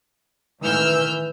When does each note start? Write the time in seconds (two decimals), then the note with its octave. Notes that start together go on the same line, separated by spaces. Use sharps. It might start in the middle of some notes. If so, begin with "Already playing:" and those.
0.62 A2 D#3 E3 E6 F6 G6